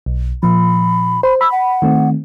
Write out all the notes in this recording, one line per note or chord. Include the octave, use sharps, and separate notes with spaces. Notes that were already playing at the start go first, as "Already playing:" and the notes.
B1
A#2 F3 B5
C5 B5
B5 E6
F#5
D#3 A3 C4